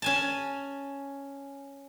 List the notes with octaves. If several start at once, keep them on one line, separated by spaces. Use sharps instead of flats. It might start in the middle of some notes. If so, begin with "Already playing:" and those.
C#4 G#5 A5